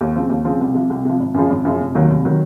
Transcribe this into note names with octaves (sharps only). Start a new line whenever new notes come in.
D#2
C#3 F3 C4
D#2
C#3 F3 C4
C2
C3 F3
C2
C3 F3
G#1
F#2 C#3 F3
G#1
F#2 C#3 F3
F1
D#2 D#3 F#3
F1
D#3 F#3